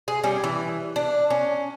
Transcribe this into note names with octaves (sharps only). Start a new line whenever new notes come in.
G#4
G3 C#4
E3
D4
C#4